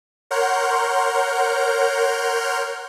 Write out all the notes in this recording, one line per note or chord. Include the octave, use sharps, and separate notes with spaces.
A#4 C#5 F#5 C6 F6 G6